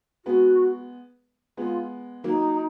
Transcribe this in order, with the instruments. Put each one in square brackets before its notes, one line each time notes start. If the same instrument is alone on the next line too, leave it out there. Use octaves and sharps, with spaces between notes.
[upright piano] G#3 B3 [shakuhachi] F#4
[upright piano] G#3 B3 [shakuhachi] F4
[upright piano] F#3 A#3 [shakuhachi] D#4